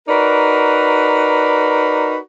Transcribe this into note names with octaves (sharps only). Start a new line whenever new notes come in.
D#4 F#4 A#4 B4 D5